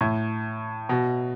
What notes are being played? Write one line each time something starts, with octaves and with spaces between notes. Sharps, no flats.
A2
B2